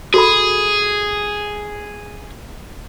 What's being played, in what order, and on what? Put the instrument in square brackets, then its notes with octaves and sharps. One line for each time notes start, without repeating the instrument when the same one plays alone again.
[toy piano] F#4 A4 B5 [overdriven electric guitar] G#4